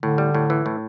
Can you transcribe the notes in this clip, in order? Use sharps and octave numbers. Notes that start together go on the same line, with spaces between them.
A2 D3
G3
A2
E3
A2